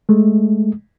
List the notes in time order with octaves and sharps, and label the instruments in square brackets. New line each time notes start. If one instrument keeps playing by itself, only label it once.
[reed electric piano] G#3 A3